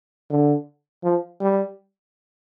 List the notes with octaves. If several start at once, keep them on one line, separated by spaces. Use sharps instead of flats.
D3
F3
G3